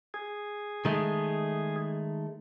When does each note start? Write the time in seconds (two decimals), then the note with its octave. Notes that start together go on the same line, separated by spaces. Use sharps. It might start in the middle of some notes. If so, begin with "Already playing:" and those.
0.14 G#4
0.85 D#3 G#3 A3